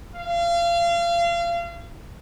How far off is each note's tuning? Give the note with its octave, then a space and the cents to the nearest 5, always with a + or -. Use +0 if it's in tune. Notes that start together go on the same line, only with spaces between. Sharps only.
F5 -30